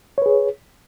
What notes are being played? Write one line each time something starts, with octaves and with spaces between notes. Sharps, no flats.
G#4 B4 C#5